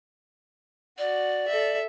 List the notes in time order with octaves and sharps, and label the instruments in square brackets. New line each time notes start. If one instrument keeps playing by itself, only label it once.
[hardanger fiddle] F#4 [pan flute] D5
[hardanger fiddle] A4 E5